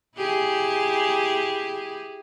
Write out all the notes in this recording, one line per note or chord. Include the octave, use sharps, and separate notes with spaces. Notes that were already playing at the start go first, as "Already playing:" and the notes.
E4 G4 G#4